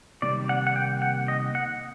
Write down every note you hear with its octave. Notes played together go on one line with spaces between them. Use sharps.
C3 D#3 G3 A#3 D5
F#5
F#5
G5
F#5
D#5
F#5